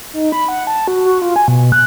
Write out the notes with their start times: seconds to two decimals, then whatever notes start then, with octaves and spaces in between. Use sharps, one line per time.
0.14 D#4
0.32 B5
0.49 F#5
0.67 A5
0.88 F#4
1.05 F#4
1.22 F4
1.36 G#5
1.48 B2
1.72 F#6